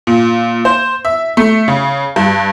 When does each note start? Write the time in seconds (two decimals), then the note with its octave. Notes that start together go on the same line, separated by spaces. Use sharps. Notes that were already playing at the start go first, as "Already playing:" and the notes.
0.07 A#2
0.65 C5
1.05 E5
1.37 A3
1.68 C#3
2.16 G2